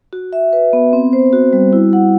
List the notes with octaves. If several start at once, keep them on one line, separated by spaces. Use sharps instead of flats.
F#4
E5
B4
B3
C4
C5
F#4
G3
E4
F#5